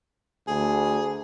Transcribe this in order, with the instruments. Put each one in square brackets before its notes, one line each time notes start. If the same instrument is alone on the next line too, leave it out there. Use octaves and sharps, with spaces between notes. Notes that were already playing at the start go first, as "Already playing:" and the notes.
[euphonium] D2 [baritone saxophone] G#4